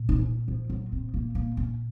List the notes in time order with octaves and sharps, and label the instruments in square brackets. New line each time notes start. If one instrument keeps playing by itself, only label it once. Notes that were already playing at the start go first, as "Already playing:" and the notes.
Already playing: [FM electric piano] A#2
[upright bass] D#4
C#4
F3
F#3
C4
A#3
A#3
C#4